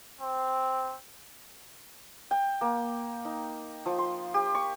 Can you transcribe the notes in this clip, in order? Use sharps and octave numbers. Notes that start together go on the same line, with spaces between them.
C4
G5
A#3
D#4
F3
C6
G4
C#6